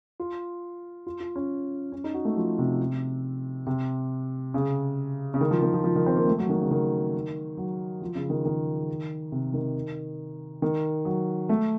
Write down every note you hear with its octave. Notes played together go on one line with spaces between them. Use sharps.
F4
F4
F4
C#4
C#4
D#4
F#4
A3
F3
C3
C3
C#3
C#3
D#3
F3
D#3
F3
F3
D#3
C4
A#3
A3
F#3
D#3
C#3
D#3
F#3
F3
C#3
D#3
D#3
C3
D#3
D#3
F#3
A3